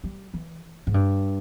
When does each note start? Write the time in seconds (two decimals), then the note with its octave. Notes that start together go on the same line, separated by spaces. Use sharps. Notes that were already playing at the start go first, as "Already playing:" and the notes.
0.04 G3
0.34 E3
0.87 G#2
0.94 G2